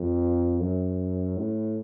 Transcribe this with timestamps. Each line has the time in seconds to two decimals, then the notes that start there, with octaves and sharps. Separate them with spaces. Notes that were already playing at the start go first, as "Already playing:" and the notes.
Already playing: F2
0.60 F#2
1.37 A2